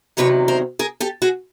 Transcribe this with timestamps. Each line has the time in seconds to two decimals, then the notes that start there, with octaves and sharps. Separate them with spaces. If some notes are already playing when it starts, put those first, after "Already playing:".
0.17 E2 C3 D#3 F#3 B4 C#5
0.48 A#4 C5
0.79 G#4 A#4
1.00 G4 A4
1.22 F#4 G#4